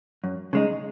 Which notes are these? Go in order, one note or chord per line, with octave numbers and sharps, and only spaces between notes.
F#2
C#3 G#3 D#4